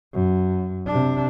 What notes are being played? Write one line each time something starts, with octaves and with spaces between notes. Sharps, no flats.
F#2
C3 D4